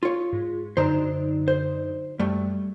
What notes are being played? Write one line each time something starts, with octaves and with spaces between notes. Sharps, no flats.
F4 C#5
G#2
F#2 D3 D#4 C5 A#5
C5
F#2 G3 A3